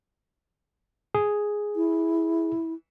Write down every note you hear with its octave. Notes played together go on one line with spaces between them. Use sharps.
G#4
E4